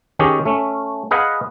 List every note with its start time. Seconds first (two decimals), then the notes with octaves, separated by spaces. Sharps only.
0.19 D#3 C#4 G4 G#4 C#5
0.46 A3 C#4
1.11 G#4 B4 D#5 F5 F#5 G#5